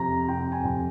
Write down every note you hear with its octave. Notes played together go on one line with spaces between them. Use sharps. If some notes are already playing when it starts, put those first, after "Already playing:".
Already playing: F2 C3 A#5
C3 G5
G#5
F2